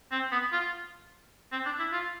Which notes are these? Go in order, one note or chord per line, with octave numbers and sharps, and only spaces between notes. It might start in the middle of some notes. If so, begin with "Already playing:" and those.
C4
B3
F4
C4
D4
E4
F4